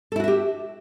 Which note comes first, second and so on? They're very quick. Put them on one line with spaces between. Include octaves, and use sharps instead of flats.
A4 E4 F#4 E5 G4